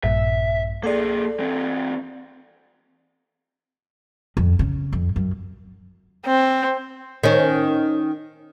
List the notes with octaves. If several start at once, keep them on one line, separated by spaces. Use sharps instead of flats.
A#1 G2 A#2 E5
A#3 G#4 A4 D5
E3 C4
F2
C#3
F2
F#2
C4
D#3 C#4